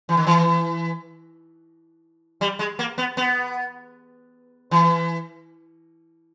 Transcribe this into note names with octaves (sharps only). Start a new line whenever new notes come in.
E3
D#3
E3
G3
G#3
A#3
B3
B3
E3